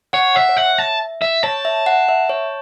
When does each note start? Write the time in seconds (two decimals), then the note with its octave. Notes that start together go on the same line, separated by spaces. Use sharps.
0.13 C#5 F#5
0.35 E5 F#5
0.49 C#5
0.57 E5 F#5
0.78 A5
1.22 E5
1.43 C#5 A5
1.65 E5
1.86 F#5
2.09 E5
2.29 C#5